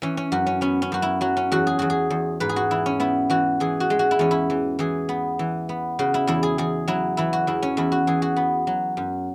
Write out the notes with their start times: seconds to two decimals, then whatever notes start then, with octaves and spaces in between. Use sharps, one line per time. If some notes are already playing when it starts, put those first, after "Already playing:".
0.02 E3 C#4
0.17 C#4
0.32 F#2 F#4
0.46 C#4
0.61 B3 C#4
0.82 C#4
0.92 F#2 F#4
1.02 E4
1.21 F#3 F#4
1.37 C#4
1.52 E2 F#4
1.67 G#4
1.79 E2 F#4
1.90 G#4
2.10 E2
2.40 G#2 B4
2.49 G#4
2.56 F#4
2.71 E3 E4
2.86 C#4
3.00 B3 E4
3.30 E3 F#4
3.60 E3 G#4
3.80 F#4
3.90 G#3
3.99 F#4
4.11 E4
4.19 E2 C#4
4.31 E4
4.50 E3
4.79 E3 G#4
5.09 B3
5.39 E3
5.69 B3
5.99 C#3 F#4
6.14 E4
6.27 E2 E4
6.43 G#4
6.58 E2 G#4
6.88 F#3 E4
7.17 E3 E4
7.33 F#4
7.47 E2 E4
7.62 C#4
7.77 E2 E4
7.92 F#4
8.07 E3 G#4
8.22 F#4
8.36 B3
8.67 F#3
8.97 F#2